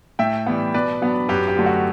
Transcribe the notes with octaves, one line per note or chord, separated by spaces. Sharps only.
A2 E5 G5
E3 G3 B3
B2 B4 D5
F#3 B3 D4
F#2 G4 B4
G4
D3 F#3 A3
F#4